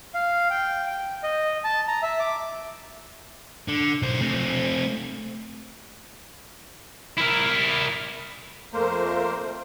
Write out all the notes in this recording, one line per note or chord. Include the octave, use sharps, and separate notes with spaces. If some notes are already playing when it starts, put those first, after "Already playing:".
F5
G5
G5
D#5
A5
A#5
E5
D6
D3
B1 C5
A3 C4
E4 A#4
F2 A3 A#3 A#4 C5